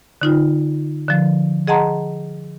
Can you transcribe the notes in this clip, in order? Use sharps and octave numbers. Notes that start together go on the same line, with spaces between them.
D3 D#4 F4
D3 F3
G#4 D#5 F#5 A5 A#5 C6